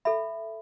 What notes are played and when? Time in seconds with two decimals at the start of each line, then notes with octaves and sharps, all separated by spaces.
0.05 A4 E5 B5